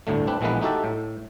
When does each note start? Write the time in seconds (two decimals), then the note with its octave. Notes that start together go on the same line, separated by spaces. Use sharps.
0.07 G1 D2 A2 D3 A3
0.27 C4 D4 B4
0.41 A#1 E3 G#3 A#3 B3 B4
0.61 A3 D#4 F#4 G4 E5 A5
0.84 A2